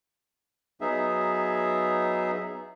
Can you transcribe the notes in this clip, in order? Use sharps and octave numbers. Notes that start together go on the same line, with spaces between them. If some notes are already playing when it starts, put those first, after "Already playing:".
F#3 B3 D#4 G#4 E5